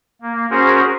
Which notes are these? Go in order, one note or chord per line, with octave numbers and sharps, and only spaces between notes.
A#3
C#4 F#4 G#4 A#4 C5